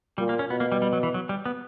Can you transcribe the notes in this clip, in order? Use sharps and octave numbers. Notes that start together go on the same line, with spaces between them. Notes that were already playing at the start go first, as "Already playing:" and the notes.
A#2 G3
A#3
C#4
B2 B3
A#3
G3
G3
F#3
E3
F#3
G3
B3